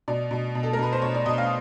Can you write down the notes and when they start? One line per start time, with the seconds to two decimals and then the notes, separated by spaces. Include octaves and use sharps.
0.08 B2 D5
0.31 B2
0.55 B2
0.63 A4
0.73 A#4
0.79 B2 B4
0.93 C5
1.02 B2 C#5
1.15 D5
1.26 B2 D#5
1.38 F5